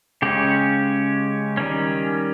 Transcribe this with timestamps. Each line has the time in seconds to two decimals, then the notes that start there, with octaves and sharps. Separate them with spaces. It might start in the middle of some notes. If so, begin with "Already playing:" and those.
0.22 C#3 G#3 C#4 G4
1.57 D#3 G3 C#4